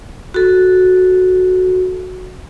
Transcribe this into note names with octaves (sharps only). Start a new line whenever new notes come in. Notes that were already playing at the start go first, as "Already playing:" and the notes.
F#4 A4